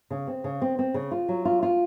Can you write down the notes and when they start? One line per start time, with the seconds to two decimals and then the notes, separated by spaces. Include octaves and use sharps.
0.11 C#3
0.27 C4
0.44 C#3
0.62 C4
0.79 C4
0.94 C#3
1.11 F4
1.28 F#3
1.45 F4
1.63 F4